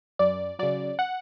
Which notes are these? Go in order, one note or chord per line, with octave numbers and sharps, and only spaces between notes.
F#2 D5
C#3 F#3 D5
F#5